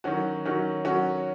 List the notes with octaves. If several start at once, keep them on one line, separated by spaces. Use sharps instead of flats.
D#3 F#3 C#4 F#4
D#3 F#3 C#4 F#4
D#3 F#3 C#4 F#4